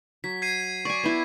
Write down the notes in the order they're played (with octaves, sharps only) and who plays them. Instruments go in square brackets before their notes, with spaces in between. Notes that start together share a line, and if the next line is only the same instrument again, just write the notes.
[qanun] F#3 [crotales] B6
[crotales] G#6 C7 D#7
[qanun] D5 G#5 [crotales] C#6
[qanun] B3 E4